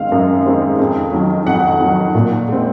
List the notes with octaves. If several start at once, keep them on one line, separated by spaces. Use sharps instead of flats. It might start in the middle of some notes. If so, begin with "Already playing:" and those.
Already playing: F#2 D#3 G#3 C4 F5
F#2
D#3 G#3 C4
F2
D#3 F#3
F2 F#5
D#3 F#3
A#2
G#3 C4